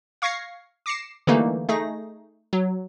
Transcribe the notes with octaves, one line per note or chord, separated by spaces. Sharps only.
F5 C#6 G#6 A#6 C7 C#7
D6 A#6 C7 C#7 E7
D3 E3 G3 A3 A#3 D#4
A3 D#4 G#4 A#6
F#3